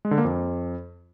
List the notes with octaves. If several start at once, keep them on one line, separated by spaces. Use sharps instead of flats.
G#3
D3
A#3
F2